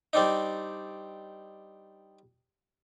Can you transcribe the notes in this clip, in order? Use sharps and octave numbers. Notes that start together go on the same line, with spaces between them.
G3 C4 D4 D#4